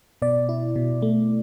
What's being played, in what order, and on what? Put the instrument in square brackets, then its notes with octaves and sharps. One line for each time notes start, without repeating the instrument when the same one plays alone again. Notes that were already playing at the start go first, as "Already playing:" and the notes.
[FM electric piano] B2 D5
E4
B2
A3